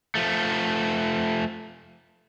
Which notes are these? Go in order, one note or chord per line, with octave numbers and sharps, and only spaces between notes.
F3 A3